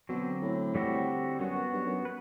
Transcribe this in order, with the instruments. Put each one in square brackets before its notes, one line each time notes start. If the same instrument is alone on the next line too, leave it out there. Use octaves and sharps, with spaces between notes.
[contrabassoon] B2 [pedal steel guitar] D3 F#3 C4
[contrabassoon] A2
[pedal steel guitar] D3 G3 C4 F#4 A4
[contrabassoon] F#2 [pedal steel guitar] F#3 B3 F#4
[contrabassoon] G2
F#2
[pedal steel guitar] B4